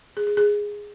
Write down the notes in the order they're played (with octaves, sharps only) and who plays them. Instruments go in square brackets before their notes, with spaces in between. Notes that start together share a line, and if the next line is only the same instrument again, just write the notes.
[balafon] G#4
G#4
G#4